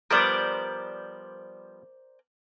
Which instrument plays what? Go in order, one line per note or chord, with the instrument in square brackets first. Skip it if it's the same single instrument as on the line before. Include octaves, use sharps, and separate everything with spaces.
[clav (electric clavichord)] F3 G3 B3 [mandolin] A#4 C5 D5